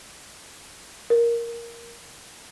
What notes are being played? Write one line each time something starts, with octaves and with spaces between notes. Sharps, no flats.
A#4